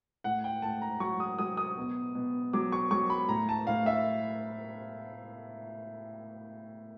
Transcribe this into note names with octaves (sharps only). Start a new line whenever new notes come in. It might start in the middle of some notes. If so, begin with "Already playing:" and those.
A2 F#5
G5
A2 A5
A#5
F#3 C#6
D#6
F#3 D#6
D#6
B2
B2
F#3 D6
C#6
F#3 C#6
B5
A2 A#5
A5
A2 F5
E5